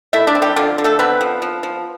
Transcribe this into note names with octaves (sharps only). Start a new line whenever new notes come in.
A3 E4 E5
D4 D5
C4
G3 G4
D3 F3 F4
D3
A3 A4
B3 C4 B4
F3
F3
F3